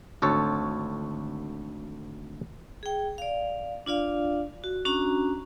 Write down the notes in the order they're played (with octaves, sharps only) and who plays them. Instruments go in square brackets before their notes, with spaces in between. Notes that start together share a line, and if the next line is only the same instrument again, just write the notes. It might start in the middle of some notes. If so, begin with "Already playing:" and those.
[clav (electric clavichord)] G#1 D2 A4 C#5
[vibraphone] G#4 G5
D5 F5
D4 F4 D5 F5
F#4
C#4 D4 F#4 A#5